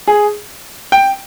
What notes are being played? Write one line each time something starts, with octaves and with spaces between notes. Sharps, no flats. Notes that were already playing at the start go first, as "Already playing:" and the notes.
G#4
G5